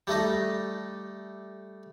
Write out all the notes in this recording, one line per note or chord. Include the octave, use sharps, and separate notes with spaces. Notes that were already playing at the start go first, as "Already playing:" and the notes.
G3 A3 D#4 D#5